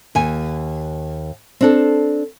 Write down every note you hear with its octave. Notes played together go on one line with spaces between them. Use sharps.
D#2 G#5
C4 D4 A4